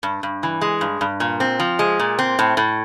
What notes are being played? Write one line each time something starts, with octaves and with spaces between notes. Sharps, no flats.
G2
G2
E3
G#3
G2
G2
A#2
C4
F3
G#3
A#2
C4
A2
A2